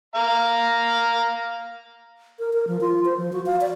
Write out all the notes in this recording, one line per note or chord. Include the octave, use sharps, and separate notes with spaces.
F5 A#5
A#4
A#4
F3
F4
C5
F3
F#4
F5
D5